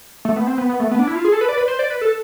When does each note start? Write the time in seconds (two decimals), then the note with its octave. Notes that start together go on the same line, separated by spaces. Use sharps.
0.25 A3
0.36 B3
0.47 C4
0.58 B3
0.69 B3
0.80 A3
0.91 B3
0.99 D4
1.07 E4
1.15 F4
1.25 G#4
1.32 A4
1.41 B4
1.49 D5
1.57 B4
1.68 C5
1.79 D5
1.90 B4
2.01 A4